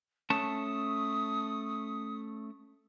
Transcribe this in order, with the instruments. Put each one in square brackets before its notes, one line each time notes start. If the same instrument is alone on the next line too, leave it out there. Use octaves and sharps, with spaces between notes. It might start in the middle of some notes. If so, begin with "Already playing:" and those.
[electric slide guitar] A3 C#4 A5 [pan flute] D#6